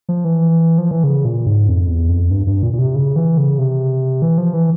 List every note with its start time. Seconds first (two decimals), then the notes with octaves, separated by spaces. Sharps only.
0.09 F3
0.25 E3
0.78 F3
0.91 E3
1.04 C#3
1.25 A#2
1.47 G#2
1.68 F2
1.88 E2
2.09 F2
2.31 G2
2.47 G2
2.63 A#2
2.73 A#2
2.79 C3
2.95 C#3
3.16 E3
3.38 C#3
3.58 C3
4.22 E3
4.38 F3
4.54 E3